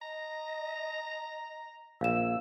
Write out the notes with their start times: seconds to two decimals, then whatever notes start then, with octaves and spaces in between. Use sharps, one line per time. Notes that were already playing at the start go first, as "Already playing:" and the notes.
0.02 D#5 A#5
2.01 A#1 F5 E6 E7